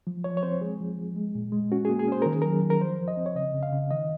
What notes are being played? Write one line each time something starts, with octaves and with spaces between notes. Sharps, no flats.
F3
F3 C#5
C#5
C4 C5
G#3 G#4
F3
F3
G#3
A#2
G#3
C#4 F#4
A#3 G#4
G#4
C#4 C5
D#3 A#4
G#4
F#3 A#4
D#3
A#4
F3 C5
F3
D#5
C4
C#5
C#3 D#5
C#3
F5
C#3
D#3 D#5